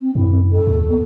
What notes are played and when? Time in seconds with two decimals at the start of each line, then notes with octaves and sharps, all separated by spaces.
0.01 C4
0.15 F#2 E4
0.52 A4
0.67 D#2
0.89 B3